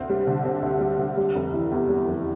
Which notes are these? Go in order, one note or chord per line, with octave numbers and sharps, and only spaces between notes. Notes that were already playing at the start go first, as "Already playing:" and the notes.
Already playing: D2 C4
G3
D3
C4
D2
G3
D3
G3
F1
E3
E2
G3
F1